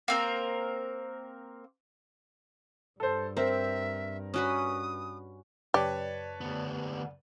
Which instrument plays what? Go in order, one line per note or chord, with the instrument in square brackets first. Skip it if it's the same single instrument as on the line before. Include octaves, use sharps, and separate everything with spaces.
[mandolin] A#3 C4 A#4
[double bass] G2 [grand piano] A4 C5
[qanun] C4 [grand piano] A#4 [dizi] E5
[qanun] C#4 F#4 B4 [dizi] D#6
[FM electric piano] F#2 C#3 D5 [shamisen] G4 [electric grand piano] B4 C#5 A5
[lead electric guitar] D2 B3